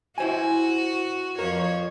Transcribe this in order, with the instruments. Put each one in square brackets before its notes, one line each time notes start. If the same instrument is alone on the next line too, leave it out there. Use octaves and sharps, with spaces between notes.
[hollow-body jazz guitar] E4 C5 G#5 [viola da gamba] F#4
[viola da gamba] F2 F3 C#5 [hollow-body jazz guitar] A#4